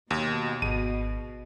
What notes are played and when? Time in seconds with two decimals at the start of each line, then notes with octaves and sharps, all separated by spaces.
0.11 D#2 B2
0.62 G#1 D#7